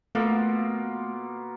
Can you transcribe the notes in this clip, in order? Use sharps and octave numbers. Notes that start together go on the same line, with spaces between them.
B2 A3 A#3 F4